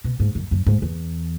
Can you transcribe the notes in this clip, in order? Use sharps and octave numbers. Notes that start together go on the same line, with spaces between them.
B2
G#2
F#2
F#2
G#2
E2